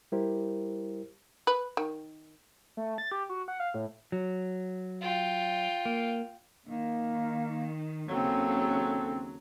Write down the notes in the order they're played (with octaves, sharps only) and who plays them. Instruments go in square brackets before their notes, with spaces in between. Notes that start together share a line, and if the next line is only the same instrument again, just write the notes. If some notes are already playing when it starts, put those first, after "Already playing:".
[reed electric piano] G3 E4 G4 A#4 C5
[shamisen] B4
D#3
[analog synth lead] A3
A6
G4
F#4
F#5
F5
A2
[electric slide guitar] F#3
[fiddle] F4 G5
[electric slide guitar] A#3
[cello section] D#3 [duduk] A#3
[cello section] D#2 C#3 A4 [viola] F#3 [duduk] C4